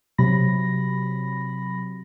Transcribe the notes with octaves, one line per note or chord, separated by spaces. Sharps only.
C3 F#3 B5 A#6